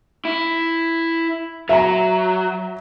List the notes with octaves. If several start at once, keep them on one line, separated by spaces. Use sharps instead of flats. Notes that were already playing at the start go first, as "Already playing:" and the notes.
E4
F#3 E5 A#5